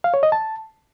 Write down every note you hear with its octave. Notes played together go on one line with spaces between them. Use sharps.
F5
C#5
D#5
A5